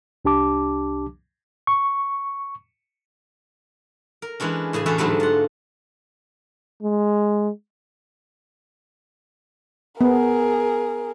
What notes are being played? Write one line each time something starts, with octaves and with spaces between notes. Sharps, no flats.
C2 D4 G4 A5 D6
C#6
A#4
E3 G#3 C#4 D4
A2 C#3 G#4 G#5
E2 C#4 D4 F#4 A4 E5
G#2 D3 F#3 G3 A3
F4 F#5
G#3
B3 G#4 A#4